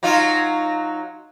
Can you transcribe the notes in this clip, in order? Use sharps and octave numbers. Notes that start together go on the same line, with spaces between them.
F#3 D#4 F4